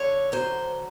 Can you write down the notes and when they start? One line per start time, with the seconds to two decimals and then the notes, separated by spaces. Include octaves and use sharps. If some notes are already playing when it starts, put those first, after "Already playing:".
Already playing: D3 C#5
0.32 F#3 C5